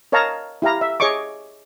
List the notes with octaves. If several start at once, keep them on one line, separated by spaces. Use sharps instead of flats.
A#4 C#5 D#5 F5 A5 A#5
E4 G4 F5 A#5
E5
G#4 C#5 D#5 C#6 D6